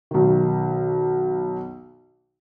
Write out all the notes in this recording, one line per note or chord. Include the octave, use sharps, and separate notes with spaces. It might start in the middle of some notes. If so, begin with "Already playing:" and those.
B1 D#3